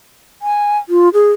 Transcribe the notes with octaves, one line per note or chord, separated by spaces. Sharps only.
G#5
F4
G#4